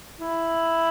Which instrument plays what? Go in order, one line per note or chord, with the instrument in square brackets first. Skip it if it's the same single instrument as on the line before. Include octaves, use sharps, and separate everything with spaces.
[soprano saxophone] E4